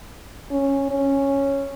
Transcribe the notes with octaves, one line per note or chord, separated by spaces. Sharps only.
C#4
C#4